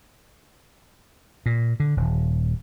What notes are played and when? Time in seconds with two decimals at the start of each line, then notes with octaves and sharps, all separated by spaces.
1.46 A#2
1.80 D3
1.97 D#1